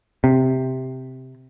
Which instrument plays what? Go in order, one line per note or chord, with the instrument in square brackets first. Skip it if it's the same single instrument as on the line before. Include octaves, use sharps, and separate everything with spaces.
[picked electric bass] C3